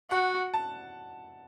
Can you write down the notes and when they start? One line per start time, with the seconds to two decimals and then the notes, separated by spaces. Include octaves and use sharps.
0.11 F#4 F#5
0.54 A5